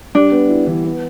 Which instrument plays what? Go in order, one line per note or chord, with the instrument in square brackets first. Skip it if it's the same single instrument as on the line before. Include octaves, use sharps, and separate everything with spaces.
[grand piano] G3 [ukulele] D4
[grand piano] B3
E4
E3
B3